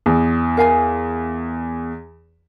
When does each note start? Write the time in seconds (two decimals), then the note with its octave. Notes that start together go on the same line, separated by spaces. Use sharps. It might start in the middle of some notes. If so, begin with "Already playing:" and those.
0.06 E2
0.57 A#4 F5 G#5